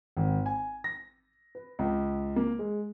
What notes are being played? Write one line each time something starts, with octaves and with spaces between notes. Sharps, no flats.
G#1
G#5
A#6
B4
C#2
A#3
G#3